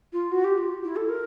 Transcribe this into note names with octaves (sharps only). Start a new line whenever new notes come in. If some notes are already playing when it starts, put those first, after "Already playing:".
F4
F#4
G4
F4
E4
A4
A#4